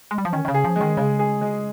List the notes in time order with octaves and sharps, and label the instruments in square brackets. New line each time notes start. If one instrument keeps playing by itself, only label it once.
[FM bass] G#3
G3
F3
[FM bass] D#3 [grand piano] C#4
[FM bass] D#3
C#3
[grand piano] G#4
[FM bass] F3
[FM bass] D#3 [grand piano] G#3
[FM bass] C#3 [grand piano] G#3
[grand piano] G#4
G#3